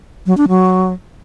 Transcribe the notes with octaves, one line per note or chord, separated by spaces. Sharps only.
F#3
D4
F#3